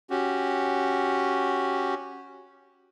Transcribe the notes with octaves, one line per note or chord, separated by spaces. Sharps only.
C#4 F#4 G4